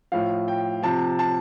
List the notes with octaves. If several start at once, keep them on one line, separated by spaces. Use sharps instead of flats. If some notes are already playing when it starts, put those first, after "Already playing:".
A2 F3 F5
G5
C3 F3 A5
A5